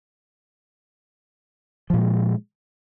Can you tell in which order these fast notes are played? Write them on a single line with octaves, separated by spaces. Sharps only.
F3 A#2 G#3